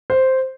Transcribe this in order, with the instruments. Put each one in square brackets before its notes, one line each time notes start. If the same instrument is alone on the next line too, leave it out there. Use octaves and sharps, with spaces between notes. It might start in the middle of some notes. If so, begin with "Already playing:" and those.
[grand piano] C5